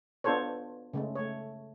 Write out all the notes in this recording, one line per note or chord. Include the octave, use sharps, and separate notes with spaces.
B3 D4 F4 A4 C5 C#5
C#3 G#3 A3
A3 C#5